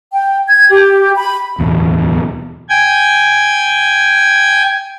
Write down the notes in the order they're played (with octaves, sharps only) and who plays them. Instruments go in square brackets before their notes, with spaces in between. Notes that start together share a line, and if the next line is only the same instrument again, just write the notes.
[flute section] G5
G#6
G4
B5
[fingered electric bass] D1 E2 B2
[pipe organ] G5 G#5 G#6